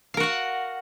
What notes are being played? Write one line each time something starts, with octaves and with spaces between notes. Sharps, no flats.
F#4 A#4 F5 F#5